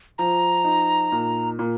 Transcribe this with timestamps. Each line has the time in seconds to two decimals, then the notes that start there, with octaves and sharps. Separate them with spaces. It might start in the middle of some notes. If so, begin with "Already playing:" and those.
0.18 F3 A#5
0.64 D#4
1.12 A#2
1.59 A#2